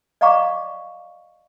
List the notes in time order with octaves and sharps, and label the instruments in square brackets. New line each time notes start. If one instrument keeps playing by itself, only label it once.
[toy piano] D5 D#5 F5 A#5 C#6 D6